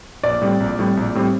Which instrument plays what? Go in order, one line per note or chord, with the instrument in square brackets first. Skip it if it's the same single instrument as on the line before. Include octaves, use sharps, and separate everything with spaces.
[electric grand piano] A#1 [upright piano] D5
[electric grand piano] A2 G3 C4
A#1
A2 G3 C4
A#1
A2 G3 C4